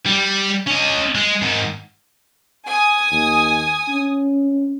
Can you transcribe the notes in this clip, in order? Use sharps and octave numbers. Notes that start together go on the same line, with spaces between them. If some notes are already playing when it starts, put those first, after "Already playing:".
G3
C#4 D#5
G#3
G#2 D#3
G#5 D#6
D#2
C#4